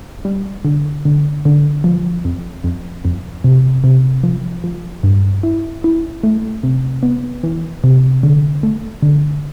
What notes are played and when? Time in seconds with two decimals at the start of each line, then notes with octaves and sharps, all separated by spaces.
0.25 G3
0.65 D3
1.05 D3
1.45 D3
1.84 F3
2.25 F2
2.64 F2
3.05 F2
3.44 C3
3.84 C3
4.23 F3
4.64 F3
5.03 G2
5.43 E4
5.84 E4
6.23 A3
6.63 C3
7.03 B3
7.43 E3
7.84 C3
8.23 D3
8.63 A3
9.03 D3